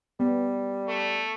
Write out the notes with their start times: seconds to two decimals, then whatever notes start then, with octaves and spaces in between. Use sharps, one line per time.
0.20 G3 B3
0.88 A3